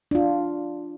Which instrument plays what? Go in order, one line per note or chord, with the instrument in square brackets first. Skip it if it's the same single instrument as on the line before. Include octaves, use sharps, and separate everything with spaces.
[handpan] D4 F4